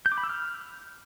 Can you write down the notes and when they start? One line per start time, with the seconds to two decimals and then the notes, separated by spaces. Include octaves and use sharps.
0.06 G6
0.12 D6
0.18 B5
0.24 E6
0.30 F6